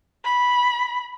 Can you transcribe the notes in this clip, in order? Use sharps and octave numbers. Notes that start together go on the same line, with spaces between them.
B5